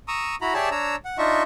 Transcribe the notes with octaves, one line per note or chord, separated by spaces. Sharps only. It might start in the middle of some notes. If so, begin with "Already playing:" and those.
A#5 C#6 D#6 E6
E4 F#4 A#5 B5
G4 G#4 C#5 D5 E5 A5
D4 C#5 A#5 E6
F#5
D4 D#4 F4 D#5 E5 C#6